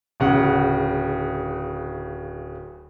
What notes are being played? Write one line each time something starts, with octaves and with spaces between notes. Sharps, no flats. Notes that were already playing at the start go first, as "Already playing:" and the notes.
D1 C#3 F#5